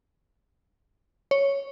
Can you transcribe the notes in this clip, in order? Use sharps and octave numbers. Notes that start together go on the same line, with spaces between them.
C#5